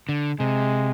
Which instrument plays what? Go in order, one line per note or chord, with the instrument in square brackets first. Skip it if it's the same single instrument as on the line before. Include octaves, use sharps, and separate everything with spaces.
[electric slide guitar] D3
[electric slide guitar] C3 [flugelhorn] G#3